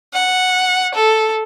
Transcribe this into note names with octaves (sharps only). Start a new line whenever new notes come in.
F#5
A4